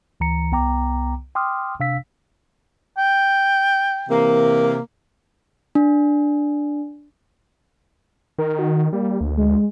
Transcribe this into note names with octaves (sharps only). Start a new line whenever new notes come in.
D2 E3 A#5 C#7
C2 B3 G5 A#5 D6
G5 C6 D6 D#6 F6
C3 D4 F5 E6 B6
G5
C3 E3 A#3
D4
D#3 A#4
F#4
G3 A#3
D2
G#3